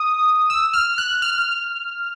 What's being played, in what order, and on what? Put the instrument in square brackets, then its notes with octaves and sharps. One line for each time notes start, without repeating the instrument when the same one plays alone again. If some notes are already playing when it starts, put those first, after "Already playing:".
Already playing: [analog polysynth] D#6
E6
F6
F#6
F6